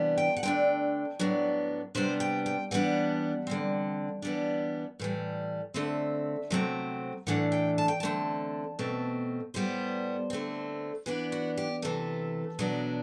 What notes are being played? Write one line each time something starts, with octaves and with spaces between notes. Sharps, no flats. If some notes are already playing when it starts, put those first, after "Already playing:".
Already playing: C3 E3 G3 B3 D4
G5
F#5
D3 A3 D4 G5
A2 F#3 B3 D4
C3 G3 B3 D4 C5
G5
G5
E3 G3 B3 D4 F#5
D3 G3 C4
E3 G3 B3 D4
A2 E3 G3
D3 A3 C4 E5
C3 F#3 A3 C4
A2 E3 A3 D4 F#5
G5
A5
G5
D3 A3 C4 A5
B2 A3 C4
A2 G3 B3 C5
D3 A3 C4
E3 B3 D4 B4
F#4
G4
C3 E3 A3 A4
B2 F#3 B3 D4